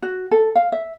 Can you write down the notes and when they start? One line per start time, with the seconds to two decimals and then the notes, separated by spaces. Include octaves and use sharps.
0.02 F#4
0.31 A4
0.55 F5
0.72 E5